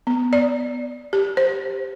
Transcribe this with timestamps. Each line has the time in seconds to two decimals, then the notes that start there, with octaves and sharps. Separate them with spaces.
0.07 B3
0.33 D5
1.13 G4
1.37 C5